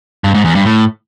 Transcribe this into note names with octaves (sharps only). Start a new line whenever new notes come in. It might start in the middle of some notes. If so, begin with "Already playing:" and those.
G2
G#2
E2
G2
A2